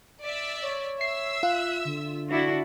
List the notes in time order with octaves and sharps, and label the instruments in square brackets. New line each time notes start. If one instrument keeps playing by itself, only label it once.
[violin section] D5 E5
[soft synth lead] C#5
[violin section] E5 E6 [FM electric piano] C7
[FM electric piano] F4 [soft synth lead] F#6
[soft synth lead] D3
[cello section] D4 E4 F#4